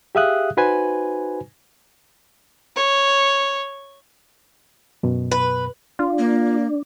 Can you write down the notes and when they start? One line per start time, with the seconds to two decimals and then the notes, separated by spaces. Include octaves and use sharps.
0.15 G4 G#4 E5 F5 D#6 F#6
0.57 D#4 F#4 B4 C5 G#5
2.76 C#5
5.03 F#2 B2
5.32 B4
5.99 D4 F4
6.19 A#3